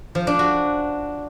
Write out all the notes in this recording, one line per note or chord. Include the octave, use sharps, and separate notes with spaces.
F3
D4
F#4